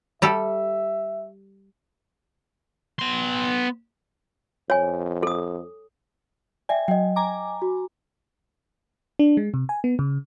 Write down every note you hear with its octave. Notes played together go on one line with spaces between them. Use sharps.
G3 G4 A4 E5
B3 C6
F2 C#5 G#5
A4 D#6
D5 E5 G5 G#5
F#3 D#5 G5
G#5 A#5 D6
F#4
D4
G#3
C3
G#5
B3
C#3